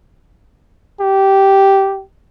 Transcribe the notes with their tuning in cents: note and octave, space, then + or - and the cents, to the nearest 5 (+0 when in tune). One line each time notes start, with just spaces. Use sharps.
G4 -10